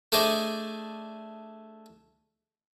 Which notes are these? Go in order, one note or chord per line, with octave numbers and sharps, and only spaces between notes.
A3 D4 G#4 C5 D5 D#5